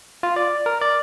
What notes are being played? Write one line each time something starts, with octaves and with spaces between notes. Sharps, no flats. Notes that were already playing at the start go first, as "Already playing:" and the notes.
F4
D5
A#4
D5